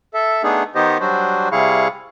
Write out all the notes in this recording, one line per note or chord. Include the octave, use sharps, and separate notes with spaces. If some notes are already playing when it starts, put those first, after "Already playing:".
A4 E5
A3 B3 D4 D#4 G#4
D#3 B3 D#4 G4 C5 D#5
F#3 G3 D4 F#4 C5
C3 G3 E4 G#4 F5 C#6